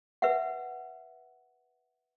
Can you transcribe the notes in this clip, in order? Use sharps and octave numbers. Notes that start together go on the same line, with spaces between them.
B4 E5 F#5